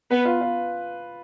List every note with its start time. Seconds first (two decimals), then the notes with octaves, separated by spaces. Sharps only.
0.10 B3 B4
0.25 F4
0.41 F4